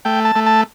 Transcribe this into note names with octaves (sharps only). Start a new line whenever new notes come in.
A3 G5
A5
A3
A5